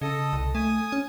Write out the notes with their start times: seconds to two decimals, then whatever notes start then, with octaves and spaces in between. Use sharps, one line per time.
0.01 C#3 A4 D#5
0.33 C2
0.55 A3 G#5 D#6
0.92 C#4